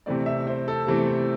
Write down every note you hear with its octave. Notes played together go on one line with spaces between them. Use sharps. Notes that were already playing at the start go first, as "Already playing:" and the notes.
C3 E3 A3 C4 D5
E5
C5
A4
C3 E3 A3 C4 G4